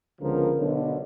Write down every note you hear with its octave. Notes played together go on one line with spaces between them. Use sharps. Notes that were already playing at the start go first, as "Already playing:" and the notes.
C#2 D3 F3 B3 A#4
B1 D3